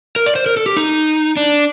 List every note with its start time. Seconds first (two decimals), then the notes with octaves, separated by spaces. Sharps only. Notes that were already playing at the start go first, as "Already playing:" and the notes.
0.16 A#4
0.26 D5
0.36 C5
0.46 A#4
0.57 A4
0.66 G4
0.77 D#4
1.37 D4